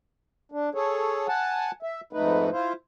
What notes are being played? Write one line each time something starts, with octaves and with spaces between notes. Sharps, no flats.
D4
G#4 A4 C#5
F#5 G#5 A5
E5
F2 G#2 A3 D#4 B4
E4 F4 C5